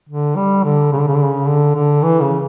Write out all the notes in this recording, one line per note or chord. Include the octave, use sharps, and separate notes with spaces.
D3
G3
D3
C#3
D3
C#3
D3
C#3
D3
D3
E3
C#3